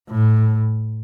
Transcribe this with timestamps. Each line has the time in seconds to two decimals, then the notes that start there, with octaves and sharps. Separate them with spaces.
0.10 A2